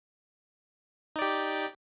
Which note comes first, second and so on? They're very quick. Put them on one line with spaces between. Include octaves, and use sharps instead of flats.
D#4 D5 G4